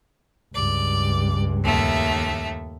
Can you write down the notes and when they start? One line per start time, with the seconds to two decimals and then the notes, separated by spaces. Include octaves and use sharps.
0.54 C#2 G2 D5
1.63 D#2 A3 E5